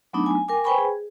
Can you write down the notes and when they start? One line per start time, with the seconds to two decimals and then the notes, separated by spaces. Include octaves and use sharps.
0.13 F#3 A3 B3 D4 D#4
0.26 G#5
0.48 A#4 G5 G#5 D6
0.64 B4 C5 G5 G#5 B5 C#6
0.78 G#4